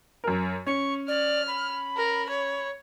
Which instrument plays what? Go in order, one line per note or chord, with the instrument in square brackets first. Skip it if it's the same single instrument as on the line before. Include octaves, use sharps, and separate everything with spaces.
[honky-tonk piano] F#2 A#4
[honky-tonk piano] C#4 [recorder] C#6
[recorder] D5 [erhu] F6
[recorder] B5
[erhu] A#4
C#5